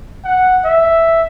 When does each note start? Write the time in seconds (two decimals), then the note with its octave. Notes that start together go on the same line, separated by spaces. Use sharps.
0.24 F#5
0.65 E5